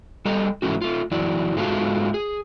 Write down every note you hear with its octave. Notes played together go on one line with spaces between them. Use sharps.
G3 A4 D#5 A#5
G#2 E3 G3 A3 C#4 F#4
A3 F4
E3 F#3 E4 D5
G#2 G#3 A3 F4 F#4 A5
G#4